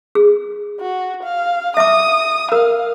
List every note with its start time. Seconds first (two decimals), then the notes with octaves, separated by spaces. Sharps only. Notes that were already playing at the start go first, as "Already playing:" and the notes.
0.15 G#4
0.81 F#4
1.23 F5
1.77 E5 D6 D#6
2.52 A#4 F5